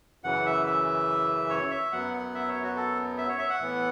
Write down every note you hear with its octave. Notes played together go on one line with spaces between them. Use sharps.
F#2 C#3 E3 F#5
E5
E5
C#5
E5
F#2 F#3 B3 F#5
F#5
E5
C#5
F#4
A4
E5
C#5
E5
F#5
A2 E3 B3